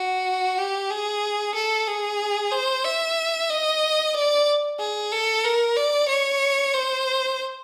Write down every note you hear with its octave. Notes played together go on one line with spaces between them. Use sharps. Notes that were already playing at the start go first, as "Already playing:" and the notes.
Already playing: F#4
G4
G#4
A4
G#4
C5
E5
D#5
D5
G#4
A4
A#4
D5
C#5
C5